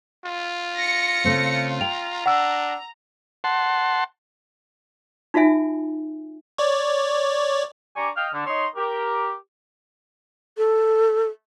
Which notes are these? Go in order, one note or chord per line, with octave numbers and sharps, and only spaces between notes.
F4
A#6 C#7
C#3 A3 C4
G5 A#5 F7
D4 F#5 E6
F#5 A5 C6
D#4 F4 F#4 E5 G#5
C#5 D5
D4 G4 D5 G#5 A#5 C#6
D#5 F5 G5 F6
D3
D#4 C#5 D#5 C6
G4 A#4
A4